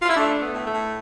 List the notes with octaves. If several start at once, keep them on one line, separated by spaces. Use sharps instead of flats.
F4
E4
A3 D4
A3
B3
A2
A3
A2